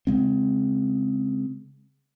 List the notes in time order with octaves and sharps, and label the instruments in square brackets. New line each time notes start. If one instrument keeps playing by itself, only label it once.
[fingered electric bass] C#3 G#3 C4